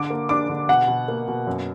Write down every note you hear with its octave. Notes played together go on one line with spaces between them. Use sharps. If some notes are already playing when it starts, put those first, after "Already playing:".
Already playing: D3 D6
A#3
D4 D6
D3
B2 F#5
B2
A#3
B2
F#2